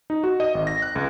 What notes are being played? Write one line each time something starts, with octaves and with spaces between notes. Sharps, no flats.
D#4
F#4
D#5
G#1
A#6
F#6
C#2